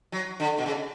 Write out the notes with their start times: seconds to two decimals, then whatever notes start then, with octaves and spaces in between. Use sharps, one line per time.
0.12 F#3
0.40 D3
0.58 B2
0.66 C#3